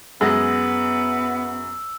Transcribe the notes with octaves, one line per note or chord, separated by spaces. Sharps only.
F#2 G#3 B3 E6 A#6